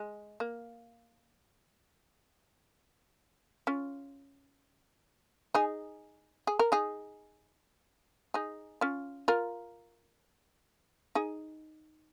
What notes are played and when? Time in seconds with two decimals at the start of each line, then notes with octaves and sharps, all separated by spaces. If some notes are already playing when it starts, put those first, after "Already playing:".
Already playing: G#3
0.40 A#3
3.67 C#4 F4
5.55 D#4 G#4
6.47 G#4
6.59 A#4
6.72 D#4 G#4
8.34 D#4 G#4
8.81 C#4 F4
9.28 F4 A#4
11.15 D#4 G#4